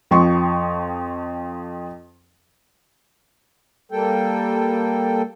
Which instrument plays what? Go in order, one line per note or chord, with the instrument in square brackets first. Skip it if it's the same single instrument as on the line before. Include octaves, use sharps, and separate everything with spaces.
[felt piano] F2 F3 G5 C6 C#6
[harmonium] G3 A#3 A4 G5